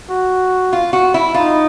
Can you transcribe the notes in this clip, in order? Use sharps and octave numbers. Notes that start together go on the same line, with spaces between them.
F#4
F4
F#4
E4
D#4 F4